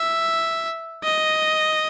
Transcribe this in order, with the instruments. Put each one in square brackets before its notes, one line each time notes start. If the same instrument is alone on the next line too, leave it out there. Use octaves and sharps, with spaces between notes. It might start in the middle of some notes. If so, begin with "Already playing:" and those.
Already playing: [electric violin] E5
D#5